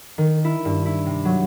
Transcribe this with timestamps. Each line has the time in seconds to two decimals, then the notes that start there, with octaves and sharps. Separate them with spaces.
0.18 D#3
0.45 E4
0.65 G2
0.86 E4
1.06 C3
1.25 F#3